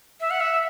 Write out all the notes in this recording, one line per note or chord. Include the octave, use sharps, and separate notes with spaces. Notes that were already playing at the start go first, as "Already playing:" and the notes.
E5
F#5
E5